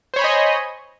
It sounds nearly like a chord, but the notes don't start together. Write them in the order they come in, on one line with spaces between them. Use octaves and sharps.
C5 C#5 B5 G#5 D#5